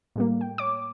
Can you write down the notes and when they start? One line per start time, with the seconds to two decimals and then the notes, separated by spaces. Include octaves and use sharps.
0.16 A2 G3 A#3
0.41 G5
0.58 C#5 D6